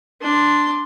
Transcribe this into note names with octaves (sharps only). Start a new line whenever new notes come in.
D4 C6